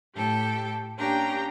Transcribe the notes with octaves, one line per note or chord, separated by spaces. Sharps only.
A2 G4 A4 G5
A#3 C#4 D4 G4 G5 A#5